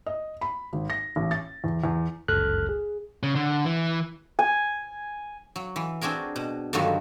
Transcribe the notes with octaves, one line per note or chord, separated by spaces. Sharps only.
D#5
B5
G#1
A#6
A1
A6
E2
E2
G1 C#2 F#2 A4 F6 F#6
G#4
C#3
D3
E3
G#5
F#3
E3
C4 D4 F#4 G#4 A#4
B2
G2 D3 D#3 F3 F#3 F#4